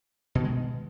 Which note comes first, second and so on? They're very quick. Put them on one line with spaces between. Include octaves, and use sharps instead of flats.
B2 D#3 G#3